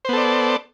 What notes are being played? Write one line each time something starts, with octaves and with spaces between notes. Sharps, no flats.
B3 A4 C5 D5